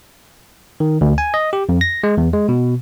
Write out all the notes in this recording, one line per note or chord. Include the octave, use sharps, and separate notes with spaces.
D#3
D2
G#5
D#5
G4
F2
A#6
G#3
E2
G#3
B2